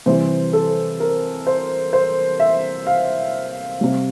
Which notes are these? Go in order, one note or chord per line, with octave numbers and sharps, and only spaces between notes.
C3 E3 G3 C5
A4
A#4
C5
C5
E5
F5
C3 G3